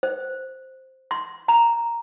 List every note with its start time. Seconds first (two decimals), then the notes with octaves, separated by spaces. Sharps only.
0.03 C5
1.11 C6
1.48 A#5